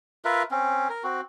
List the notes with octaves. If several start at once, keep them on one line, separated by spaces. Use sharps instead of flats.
F4 A#4 B4 E5
C4 C#4
A#4
C4 F#4